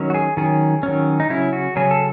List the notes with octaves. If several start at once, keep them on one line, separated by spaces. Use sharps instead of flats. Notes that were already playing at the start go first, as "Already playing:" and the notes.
Already playing: D#3 F#3 C#4
F#4
G#4
D#3 F#3 C#4 G#4
D#3 F#3 C#4
D#4
C#3 F#3 C#4 E4
F#4
C#3 F#3 C#4 G#4
A4